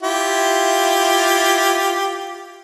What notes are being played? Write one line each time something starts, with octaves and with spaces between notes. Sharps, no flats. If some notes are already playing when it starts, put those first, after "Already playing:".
E4 F4 G4